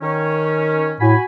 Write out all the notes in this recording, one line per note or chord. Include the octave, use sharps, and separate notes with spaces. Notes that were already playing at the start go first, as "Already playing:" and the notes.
D#3 C#4
A2 F#4 G#5 B5